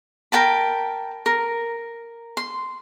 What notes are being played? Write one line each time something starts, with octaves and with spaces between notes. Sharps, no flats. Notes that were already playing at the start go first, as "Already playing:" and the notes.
A#4 G5 A5 B5
A#4
C6